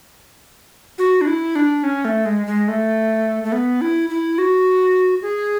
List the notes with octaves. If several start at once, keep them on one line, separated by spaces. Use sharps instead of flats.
F#4
D4
E4
D4
C#4
A3
G#3
G#3
A3
A3
B3
E4
E4
F#4
G#4